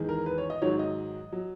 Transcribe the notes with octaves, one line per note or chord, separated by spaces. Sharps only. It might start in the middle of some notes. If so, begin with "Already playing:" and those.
Already playing: E2 D#3 G#3
A#4
B4
C#5
D#5
G#2 D#3 F#3 C#5
D#5
F#3